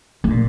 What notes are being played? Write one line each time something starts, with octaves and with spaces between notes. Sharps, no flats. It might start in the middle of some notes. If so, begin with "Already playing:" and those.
C#3
A#2